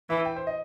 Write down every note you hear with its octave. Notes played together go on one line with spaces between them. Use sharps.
E3 E5
G5
C5
D#5